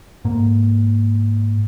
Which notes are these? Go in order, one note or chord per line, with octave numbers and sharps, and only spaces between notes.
G#2 A#3